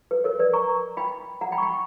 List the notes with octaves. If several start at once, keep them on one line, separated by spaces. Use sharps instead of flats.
B4
A#4 C#5
B4 D5
A#5 C#6
G5 B5
F#5 A#5
G5 B5
C#6
G5 B5